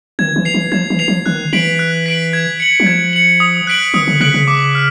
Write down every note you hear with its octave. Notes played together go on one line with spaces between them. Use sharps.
D#3 G#6
E3
C7 F7
E3
F3 G#6
E3
C7 F7
F3
D#3 F#6
E3 B6 D7 F#7
F#6
B6 D7 F#7
G#6
C#7 F#7
F#3
F3 G#6
C#7 F#7
D#6
F#6 B6 D7 F#7
D#3 D#6
D3
C#3 F#6 B6 D7 F#7
C#3
D6
F6